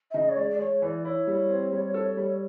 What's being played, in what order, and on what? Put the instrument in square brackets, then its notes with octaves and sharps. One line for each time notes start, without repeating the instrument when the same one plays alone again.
[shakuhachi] E5
[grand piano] C#3 [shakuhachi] D#5
[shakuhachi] C#5
[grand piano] G#3 [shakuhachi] D5
[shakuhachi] D5
[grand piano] G#3 [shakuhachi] C#5
[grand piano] E3 [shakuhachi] D5
[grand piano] E4 [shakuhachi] C#5
[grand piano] G3
C4
G3
A4
G3